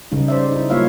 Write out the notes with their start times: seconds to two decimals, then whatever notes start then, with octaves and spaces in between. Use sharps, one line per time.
0.12 C#3 G3 D#4
0.28 C5 D5 E5
0.51 D#4 E4
0.70 G3 A#3 F4 C#5 E5 F5